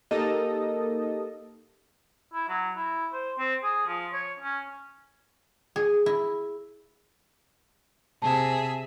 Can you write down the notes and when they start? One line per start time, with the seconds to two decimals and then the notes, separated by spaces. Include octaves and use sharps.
0.11 A#3 D#4 G4 A4 A#4 D#5
2.33 E4
2.48 F#3
2.76 E4
3.13 C5
3.38 C4
3.63 G#4
3.87 F3
4.13 C#5
4.39 C#4
5.76 G#4
6.06 E4
8.22 C3 G#4 E5 A5